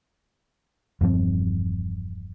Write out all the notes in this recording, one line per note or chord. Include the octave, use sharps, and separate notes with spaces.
E1 G2 F3 C4